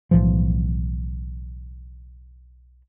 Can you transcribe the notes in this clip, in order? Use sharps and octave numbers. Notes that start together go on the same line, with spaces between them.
B1 A2 E3 F3